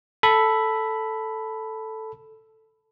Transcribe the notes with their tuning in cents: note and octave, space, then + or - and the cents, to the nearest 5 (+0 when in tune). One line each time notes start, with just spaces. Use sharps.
A4 +0 B5 +0